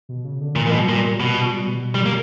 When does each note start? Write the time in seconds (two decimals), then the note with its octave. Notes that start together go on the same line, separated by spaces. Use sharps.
0.09 B2
0.24 C#3
0.41 D3
0.56 A#2 E3
0.67 A#2
0.72 B2 G3
0.83 F#3
0.88 A#2 G3
1.20 B2
1.52 G3
1.68 B2
1.95 G3
2.06 A#3